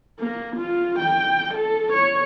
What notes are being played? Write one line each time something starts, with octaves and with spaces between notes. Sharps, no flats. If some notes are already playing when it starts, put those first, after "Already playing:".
A#3
F4
G5
A4
C#5